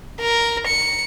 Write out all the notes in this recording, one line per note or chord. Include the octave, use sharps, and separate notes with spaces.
A#4
C#7